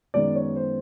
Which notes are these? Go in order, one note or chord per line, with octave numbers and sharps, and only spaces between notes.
F#2 D#3 G#3 B3 D5
C#5
C5